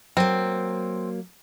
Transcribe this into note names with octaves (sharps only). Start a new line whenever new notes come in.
F#3 A#3 C4